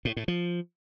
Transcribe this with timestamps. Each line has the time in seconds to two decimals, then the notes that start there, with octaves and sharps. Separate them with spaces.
0.05 A2
0.17 A2
0.28 F3